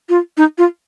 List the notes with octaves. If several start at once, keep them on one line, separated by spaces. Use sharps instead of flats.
F4
D#4
F4